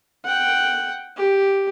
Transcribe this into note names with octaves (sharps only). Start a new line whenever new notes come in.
F#5 G5
G4